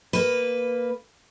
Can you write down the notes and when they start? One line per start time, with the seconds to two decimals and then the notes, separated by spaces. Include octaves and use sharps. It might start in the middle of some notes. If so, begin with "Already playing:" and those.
0.13 A#3 B4